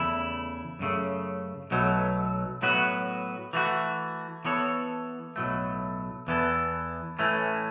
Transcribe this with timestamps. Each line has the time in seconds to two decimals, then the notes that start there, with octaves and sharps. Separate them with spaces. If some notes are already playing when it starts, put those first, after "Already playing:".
Already playing: E2 C#3 A3 E4
0.79 F#2 C#3 A3
1.71 B1 B2 F#3 A3
2.62 A2 F#3 B3 F#4
3.53 E3 A3 F#4
4.45 E3 B3 A4 C#5
5.36 B1 A2 F#3 A3
6.27 E2 E3 B3 E4 A4
7.19 A2 E3 A3 C#4